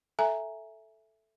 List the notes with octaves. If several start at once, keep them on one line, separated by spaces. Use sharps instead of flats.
A4 E5 G#5 A#5